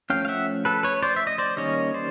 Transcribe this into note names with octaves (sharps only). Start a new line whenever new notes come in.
F3 A3 C#4 F5 G5
F5
E5 F#5
A4 B4
B4 C#5
C5 D5
E5
D#5
C5 D5
D#3 G3 A#3 C#4 C#5 D#5
C5 D5